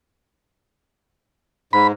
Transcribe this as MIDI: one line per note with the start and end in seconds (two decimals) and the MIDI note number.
1.73 1.92 44
1.73 1.87 83